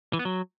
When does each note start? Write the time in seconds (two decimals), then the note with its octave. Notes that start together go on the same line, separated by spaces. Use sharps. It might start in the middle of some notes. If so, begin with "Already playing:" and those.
0.13 E3
0.19 B3
0.25 F#3